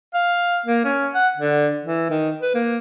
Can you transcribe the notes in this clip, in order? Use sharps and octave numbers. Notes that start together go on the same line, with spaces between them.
F5
A#3
C#4
F#5
D3
E3
D#3
B4
A#3